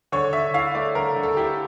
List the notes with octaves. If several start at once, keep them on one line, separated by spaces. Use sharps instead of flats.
D3 C#5
D3 E5
E4 F5
A3 D5
D3 A#4
D3
A4
E4 G4